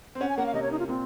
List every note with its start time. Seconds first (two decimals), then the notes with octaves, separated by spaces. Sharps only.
0.15 C4
0.21 C#4 F#5
0.29 G#5
0.37 A#3 F#5
0.46 F5
0.54 C3 D#5
0.63 C#5
0.71 D#4
0.79 F4
0.88 A#2 C4